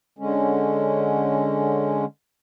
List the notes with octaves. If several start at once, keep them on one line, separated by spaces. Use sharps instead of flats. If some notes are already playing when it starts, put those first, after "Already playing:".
D3 G#3 C#4